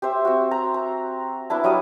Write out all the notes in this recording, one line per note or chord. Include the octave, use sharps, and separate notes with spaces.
G4 C5 E5
C4 F#4
A#5
A#5
B3 D4 E4 A5
F#3 G3 D#5 D#6